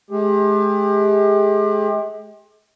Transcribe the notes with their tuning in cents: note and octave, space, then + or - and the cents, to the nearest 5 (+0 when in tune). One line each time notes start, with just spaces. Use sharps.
G#3 +40 G4 +30